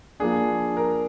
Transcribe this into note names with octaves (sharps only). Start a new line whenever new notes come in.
F3 A#3 D4 G#4
A#4